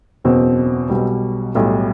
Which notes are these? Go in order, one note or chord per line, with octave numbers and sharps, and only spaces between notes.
F#1 E2 B2 C4
B1 B2 G3
B1 A2 G3